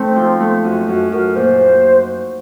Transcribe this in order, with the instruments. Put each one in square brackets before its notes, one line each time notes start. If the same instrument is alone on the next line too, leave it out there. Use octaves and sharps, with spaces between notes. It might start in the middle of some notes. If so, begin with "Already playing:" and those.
Already playing: [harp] A3 D#4 [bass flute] C4
[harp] F3
A3
[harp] F#2 [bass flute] C4
[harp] F#2
[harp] F#2 [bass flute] A#4
[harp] A#2 [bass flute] C5